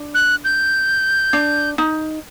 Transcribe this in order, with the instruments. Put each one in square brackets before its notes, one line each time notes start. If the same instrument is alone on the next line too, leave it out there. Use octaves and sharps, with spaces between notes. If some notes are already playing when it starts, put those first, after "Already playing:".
Already playing: [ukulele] D4
[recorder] F#6
G6
[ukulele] D4
D#4